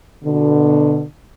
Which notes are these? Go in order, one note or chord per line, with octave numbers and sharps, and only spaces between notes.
B2 D3